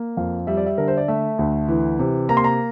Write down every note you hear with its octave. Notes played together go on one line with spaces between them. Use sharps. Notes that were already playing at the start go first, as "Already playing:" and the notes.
Already playing: A#3
F2 F5
G3 E5
D5
E5
D3 A#4
C5
D5
A3 E5
D2
E3
C3
A#3 A#5
C6
A#5